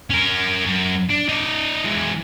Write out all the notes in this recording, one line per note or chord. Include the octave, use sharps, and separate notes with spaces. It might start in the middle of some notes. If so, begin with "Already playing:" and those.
C#4 A#4
F#2
D4
D#4 D5
E3 G#3